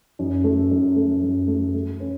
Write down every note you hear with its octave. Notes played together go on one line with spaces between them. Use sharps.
F#2
A3
F#2
A3
F#2
A3
A3
C#4